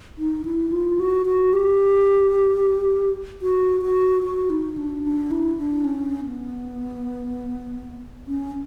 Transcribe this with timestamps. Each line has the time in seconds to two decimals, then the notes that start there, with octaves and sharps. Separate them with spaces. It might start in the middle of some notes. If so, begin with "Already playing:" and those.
0.18 D#4
0.45 E4
0.72 F4
0.99 F#4
1.26 F#4
1.53 G4
3.42 F#4
3.82 F#4
4.23 F#4
4.50 D#4
4.77 D4
5.04 D4
5.31 E4
5.57 D4
5.84 C#4
6.25 B3
8.27 C#4